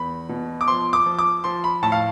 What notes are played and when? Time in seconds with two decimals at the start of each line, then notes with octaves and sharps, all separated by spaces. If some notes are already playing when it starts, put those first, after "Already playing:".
Already playing: E2 B5
0.29 B2
0.61 D6
0.67 F3 C6
0.93 D6
1.06 F3
1.19 D6
1.44 F3 C6
1.64 B5
1.83 A2 A5
1.92 F5